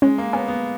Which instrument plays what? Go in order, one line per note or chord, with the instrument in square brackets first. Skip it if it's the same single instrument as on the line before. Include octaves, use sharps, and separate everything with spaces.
[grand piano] G#3 [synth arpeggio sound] C#4
[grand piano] A#3
[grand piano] B3 [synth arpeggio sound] C#4
[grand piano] B3